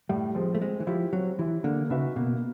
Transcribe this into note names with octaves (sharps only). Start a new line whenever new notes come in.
A2 G3
F3 G#3 C4
A3
G#3 C4
E3
F3 E4 G4
F#3 C4
E3 E4 G4
D3 A#3
C#3 D#4 F#4 B4 E5
B2 A#3